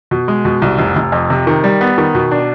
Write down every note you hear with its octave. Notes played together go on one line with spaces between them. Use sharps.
B2
G#3
B2
C2
F1
F1
F2
C3
D#3
G3
B3
D#3
B2
D4